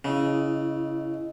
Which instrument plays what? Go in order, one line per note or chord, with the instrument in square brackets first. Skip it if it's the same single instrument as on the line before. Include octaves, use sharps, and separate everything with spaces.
[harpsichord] C#3 [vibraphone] E4 D#5